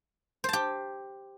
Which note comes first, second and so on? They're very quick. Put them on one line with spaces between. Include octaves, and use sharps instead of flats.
C5 A5 G4